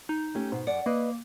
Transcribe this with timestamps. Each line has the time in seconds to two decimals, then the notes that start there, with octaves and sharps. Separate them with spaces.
0.09 D#4
0.35 A3 C#4 G4
0.52 G#2 B2
0.67 F#2 D5 F#5
0.86 A#3 B4 D#5